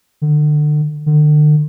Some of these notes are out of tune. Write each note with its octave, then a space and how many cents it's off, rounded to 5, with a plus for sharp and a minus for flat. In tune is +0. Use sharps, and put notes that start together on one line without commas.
D3 +30
D3 +40